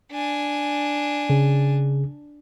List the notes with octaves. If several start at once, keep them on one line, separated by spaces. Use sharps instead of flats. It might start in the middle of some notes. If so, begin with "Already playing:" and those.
D4 G#5
C#3 G#4